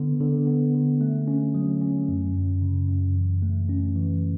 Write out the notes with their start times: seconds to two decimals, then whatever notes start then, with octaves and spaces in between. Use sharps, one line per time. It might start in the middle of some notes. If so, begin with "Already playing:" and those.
Already playing: D3 B3
0.21 D3
0.47 B3
0.74 D3
1.01 A3
1.28 C#4
1.55 F#3
1.82 C#4
2.08 F#2
2.35 F#2
2.62 C#3
2.89 F#2
3.16 E3
3.42 A3
3.69 C#4
3.96 E3